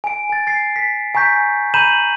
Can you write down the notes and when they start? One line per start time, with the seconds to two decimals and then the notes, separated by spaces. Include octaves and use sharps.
0.04 G#5 D7
0.29 G#5 A6
0.47 A6 C7
0.76 B6
1.15 G#5 A#5 C#6 G6 B6
1.74 A#5 B5 G6 D#7 E7 F#7